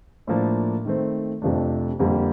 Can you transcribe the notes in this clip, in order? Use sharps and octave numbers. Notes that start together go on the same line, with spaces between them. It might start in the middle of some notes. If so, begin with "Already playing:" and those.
A2 F3 A#3 D4
D#3 A3 C4
F2 C3 F3 A3 D4
F2 D3 G3 A#3